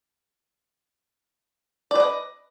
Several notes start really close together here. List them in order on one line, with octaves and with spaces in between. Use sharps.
D5 B4 D#5